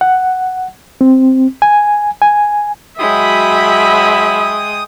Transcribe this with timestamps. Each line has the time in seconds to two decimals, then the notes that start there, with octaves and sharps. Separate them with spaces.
0.01 F#5
1.01 C4
1.62 G#5
2.22 G#5
2.99 F#3 G#3 E5 G5 B5 D#6